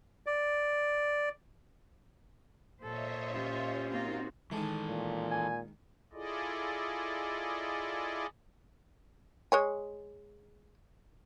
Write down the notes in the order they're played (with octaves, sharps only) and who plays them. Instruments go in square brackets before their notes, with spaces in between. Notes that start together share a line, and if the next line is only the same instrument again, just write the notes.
[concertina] D5
[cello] A#2 C5 [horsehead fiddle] A4 [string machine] C#5 D#5 E5
[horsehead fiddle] C#4 G4 [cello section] F4
[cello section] A#3 C4 F4 [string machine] D#4 F#4
[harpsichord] D#3 G#3 [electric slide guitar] E3 A4
[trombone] A#2
[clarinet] G#5
[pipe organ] E4 F4 G#4 A4 D5 D#5
[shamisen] G#3 C#5 G#5